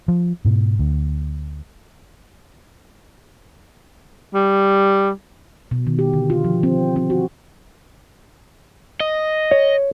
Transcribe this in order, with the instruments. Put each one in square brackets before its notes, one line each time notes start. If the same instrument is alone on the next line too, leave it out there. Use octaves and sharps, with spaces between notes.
[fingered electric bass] F3
G#2 B2
D2
[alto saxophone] G3
[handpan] B2
D#3
G4
D3
F4
F3
C4
C4
F#4
[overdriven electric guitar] D#5
[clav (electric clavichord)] C#5